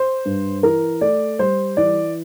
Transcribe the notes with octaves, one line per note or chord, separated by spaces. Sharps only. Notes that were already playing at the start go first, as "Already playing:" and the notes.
Already playing: C5
G2
E3 A#4
A3 D5
G3 C5
E3 D5